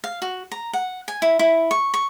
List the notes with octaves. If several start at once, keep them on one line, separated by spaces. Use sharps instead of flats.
F5
F#4
A#5
F#5
G#5
E4
E4
C#6
C#6